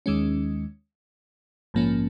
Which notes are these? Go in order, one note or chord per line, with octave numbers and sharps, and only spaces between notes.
D#2 D#3 G#3 C#4
A#1 G#2 F3 A#3 C#4